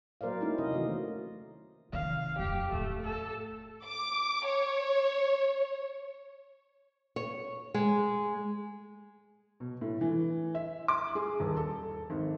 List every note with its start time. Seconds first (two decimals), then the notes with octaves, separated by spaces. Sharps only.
0.21 F#3 A#3 A#4 C5 D5 F5
0.41 A3 A#3 C#4 D#4 E4
0.58 C3 D#5
0.72 D#3 E3 A3 F#4
1.93 C3 D#3 F5
2.39 D#1 F2 G4
2.72 A2 A3
3.03 A4
3.86 D6
4.47 C#5
7.16 C#5
7.74 G#3
9.60 B2
9.81 A2
10.01 E3
10.55 E5
10.88 D6
11.15 G#4
11.40 D#1
11.57 A4
12.10 G#1